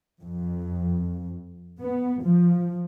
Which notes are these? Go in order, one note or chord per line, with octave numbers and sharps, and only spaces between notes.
F2
B3
F3